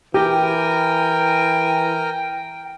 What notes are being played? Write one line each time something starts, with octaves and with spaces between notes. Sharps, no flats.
E3 G4 A#4 G5 G#5 A#5